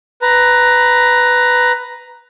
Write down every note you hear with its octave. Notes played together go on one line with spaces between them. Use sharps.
B4 A#5